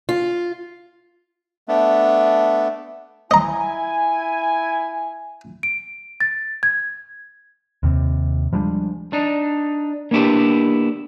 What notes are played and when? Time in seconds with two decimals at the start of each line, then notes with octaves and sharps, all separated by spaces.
0.09 F4
1.68 A3 B3 D4
3.31 E4 D#5 G#5 A#5
5.63 D7
6.21 A6
6.63 G#6
7.83 D#2 C3
8.53 F3 G3 G#3 D4
9.13 D4 D#4
10.11 A#3 B3 D4 E4 G4 B4